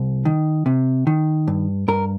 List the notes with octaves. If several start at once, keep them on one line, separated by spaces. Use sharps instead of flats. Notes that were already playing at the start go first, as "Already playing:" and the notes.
Already playing: C2
D#3
C3
D#3
G2
G2 A#4